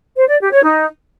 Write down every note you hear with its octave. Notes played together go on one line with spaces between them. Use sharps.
C5
D5
G4
C#5
D#4